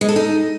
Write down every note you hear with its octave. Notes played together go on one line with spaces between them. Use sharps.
G#3
A4
D#4